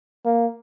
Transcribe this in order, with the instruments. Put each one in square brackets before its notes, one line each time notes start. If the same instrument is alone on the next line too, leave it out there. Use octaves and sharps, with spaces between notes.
[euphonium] A#3